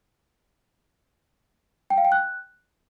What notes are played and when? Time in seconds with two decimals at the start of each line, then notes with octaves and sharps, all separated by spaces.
1.90 G5
1.98 F5
2.05 G5
2.12 F#6